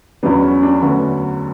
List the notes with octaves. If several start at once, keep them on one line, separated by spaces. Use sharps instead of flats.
E2 C#3 F#3 B3 D4
C#4
D4
D2 D3 F#3 B3 C#4